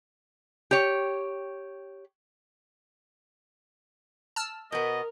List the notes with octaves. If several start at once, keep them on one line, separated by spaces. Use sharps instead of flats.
G4 C#5
A5 E6 F6
B2 B3 A#4 D#5